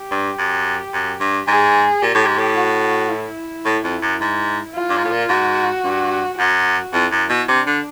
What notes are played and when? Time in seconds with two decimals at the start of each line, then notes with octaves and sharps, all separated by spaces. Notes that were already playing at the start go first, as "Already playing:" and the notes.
Already playing: G4
0.11 G2
0.38 F#2
0.93 F#2
1.20 G2
1.47 G#2 G#4
2.02 A#2 G4
2.14 A2
2.26 G#2
2.38 A2
2.57 F#4
3.11 E4
3.65 A2
3.84 F2
4.02 F#2
4.20 G#2
4.75 F4
4.89 G2
4.97 G#2
5.04 A2
5.11 A#2
5.29 G#2 F#4
5.84 G2
6.38 F#2 F#4
6.93 F2 E4
7.11 F#2
7.29 B2
7.48 C3 D4
7.67 D3